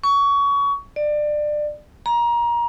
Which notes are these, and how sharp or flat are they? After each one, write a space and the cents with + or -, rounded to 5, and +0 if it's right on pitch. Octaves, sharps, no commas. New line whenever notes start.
C#6 +25
D5 +25
A#5 +25